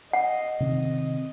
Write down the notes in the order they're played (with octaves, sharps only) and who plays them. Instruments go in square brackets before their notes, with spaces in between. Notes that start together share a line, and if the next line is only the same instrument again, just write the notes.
[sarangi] D#5 [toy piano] F#5
[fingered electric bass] C3 D#3 C4